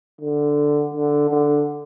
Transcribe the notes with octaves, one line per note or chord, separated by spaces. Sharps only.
D3
D3
D3